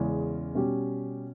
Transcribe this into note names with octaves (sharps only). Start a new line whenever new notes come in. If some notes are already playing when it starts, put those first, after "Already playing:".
Already playing: E2 C#3 G#3 C#4
B2 G3 C#4 G4